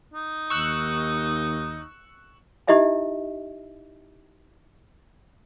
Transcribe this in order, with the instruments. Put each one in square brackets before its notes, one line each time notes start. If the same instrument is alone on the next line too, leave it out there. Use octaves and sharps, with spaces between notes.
[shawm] D#4
[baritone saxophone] D#2 [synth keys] C#6 E6 F#6
[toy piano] D#4 E4 G4 D#5 E5 G#5